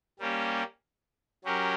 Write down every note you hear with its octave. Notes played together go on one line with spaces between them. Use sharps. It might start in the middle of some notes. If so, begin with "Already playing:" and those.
G3 A#3 C#4 G4
F#3 C#4 G4 A#4